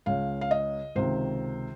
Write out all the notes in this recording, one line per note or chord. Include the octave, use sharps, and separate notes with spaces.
C#2 C#3 F5
F5
D#5
C#2 C3 D#3 C5